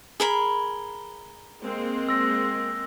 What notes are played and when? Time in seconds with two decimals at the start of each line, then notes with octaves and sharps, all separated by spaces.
0.20 G#4 A#4 B5 G7
1.62 G#3 A#3 C4
2.09 E6 A#6